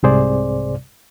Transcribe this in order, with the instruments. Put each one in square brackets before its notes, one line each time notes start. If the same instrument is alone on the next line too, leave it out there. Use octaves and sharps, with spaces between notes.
[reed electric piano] C2 G#2 C3 G#4 C5 D5